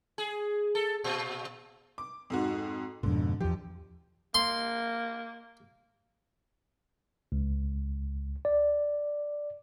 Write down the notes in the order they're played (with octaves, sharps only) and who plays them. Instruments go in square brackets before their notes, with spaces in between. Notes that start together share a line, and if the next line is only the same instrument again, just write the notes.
[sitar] G#4
A4
A#2
[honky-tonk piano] D6
F2 G#2 F#4
[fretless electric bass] F2 G#2 B2 [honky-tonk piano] D3
[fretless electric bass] E2 F3 [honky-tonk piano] G4
[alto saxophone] A#3 [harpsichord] C6
[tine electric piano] C#2
D5